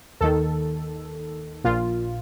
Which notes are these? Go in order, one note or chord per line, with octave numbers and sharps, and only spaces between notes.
D#2 D#3 A4
A#1 A#2 F4